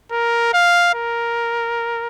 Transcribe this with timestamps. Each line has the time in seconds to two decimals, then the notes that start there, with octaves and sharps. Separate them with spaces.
0.11 A#4
0.53 F5
0.94 A#4